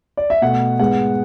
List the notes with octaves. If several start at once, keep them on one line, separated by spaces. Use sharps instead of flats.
D5
E5
B2 A3 F#5
G#2 G#3 B3 F#5